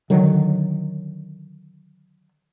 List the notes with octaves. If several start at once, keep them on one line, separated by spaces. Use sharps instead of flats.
D3 D#3 F#3